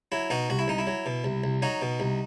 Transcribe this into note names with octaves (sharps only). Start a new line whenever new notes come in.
F#3 E4
B2 D#4 F#4
C2 F#4
E4
C2 D#4
E4
F#3
B2
C2
C2
F#3 D#4 F#4
B2
C2